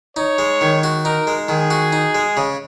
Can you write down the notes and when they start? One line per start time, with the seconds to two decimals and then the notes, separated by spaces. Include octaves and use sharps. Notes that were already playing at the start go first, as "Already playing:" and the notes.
0.16 D#4 C#5
0.38 G#3
0.61 D#3
0.83 F#4
1.05 D#4 A#4
1.27 G#3
1.49 D#3 G#4
1.71 F#4
1.93 D#4
2.15 G#3
2.37 C#3